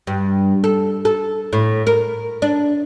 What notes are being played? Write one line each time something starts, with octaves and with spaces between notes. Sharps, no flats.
G2
A4
A4
A2
A#4
D4